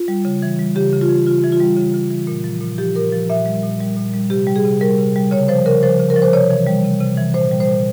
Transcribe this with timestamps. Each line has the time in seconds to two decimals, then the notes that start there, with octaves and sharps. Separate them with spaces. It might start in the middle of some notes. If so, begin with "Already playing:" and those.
Already playing: F4
0.08 G3
0.25 C#3
0.42 E3
0.59 G3
0.76 C#3 G4
0.93 C#3
1.01 F4
1.09 E3
1.27 C#3 F4
1.44 E3
1.52 F4
1.60 G3
1.77 C#3
1.94 C#3
2.11 E3
2.27 A#2
2.44 F3
2.61 A#2
2.78 F3 G4
2.96 A#2 A#4
3.13 F3
3.30 A#2 E5
3.46 G3
3.63 A#2
3.80 G3
3.97 A#2
4.14 G3
4.30 C3 G4
4.47 G3
4.56 G#4
4.64 C3
4.81 G3 A#4
4.98 C3
5.16 G3
5.31 C#3 C#5
5.48 F3 C5
5.66 C#3 A#4
5.83 F3 C5
5.99 C#3
6.10 A#4
6.16 F3
6.22 C5
6.33 C3 C#5
6.51 E3
6.67 G3
6.84 C3
7.01 C3
7.17 E3
7.34 A#2 C5
7.52 G3
7.60 C5
7.69 A#2